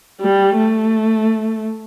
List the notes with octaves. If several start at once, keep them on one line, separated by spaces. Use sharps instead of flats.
G3
A3